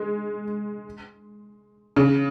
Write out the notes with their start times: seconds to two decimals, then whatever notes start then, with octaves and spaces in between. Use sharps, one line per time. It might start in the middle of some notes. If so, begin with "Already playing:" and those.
Already playing: G#3
1.96 C#3